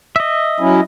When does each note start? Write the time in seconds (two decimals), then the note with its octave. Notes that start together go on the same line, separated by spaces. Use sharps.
0.16 D#5 E5
0.60 F#3 C#4 E4